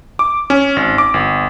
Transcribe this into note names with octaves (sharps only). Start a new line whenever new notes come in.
D6
C#4
G#1
D6
G1